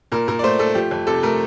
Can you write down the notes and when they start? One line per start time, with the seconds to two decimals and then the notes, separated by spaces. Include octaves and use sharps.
0.12 A#2 A#4
0.28 A#2 A#4
0.39 D5
0.43 A3 C5
0.59 A3 A4
0.75 F3 G4
0.91 F2
1.07 C3 A4
1.23 A3 A#4